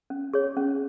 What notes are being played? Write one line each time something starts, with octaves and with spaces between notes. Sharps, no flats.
C#4
G#4 C#5
C#4